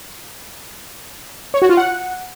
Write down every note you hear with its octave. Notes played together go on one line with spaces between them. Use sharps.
C#5
F#4
F4
F#5